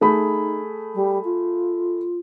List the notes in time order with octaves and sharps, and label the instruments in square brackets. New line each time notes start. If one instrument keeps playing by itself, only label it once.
[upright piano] A3 G#4 B5 [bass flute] D#4
[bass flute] G3
F4